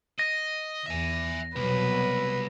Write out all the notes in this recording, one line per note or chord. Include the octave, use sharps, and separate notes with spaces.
D#5 A#6
E2 E5 G#5
C2 B2 F#3 B4